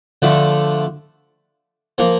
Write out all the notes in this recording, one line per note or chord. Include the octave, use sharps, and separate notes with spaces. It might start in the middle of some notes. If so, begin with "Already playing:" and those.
D3 F3 A3
F3 A#3